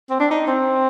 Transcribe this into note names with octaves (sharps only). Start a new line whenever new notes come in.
C4
D4
D#4
C4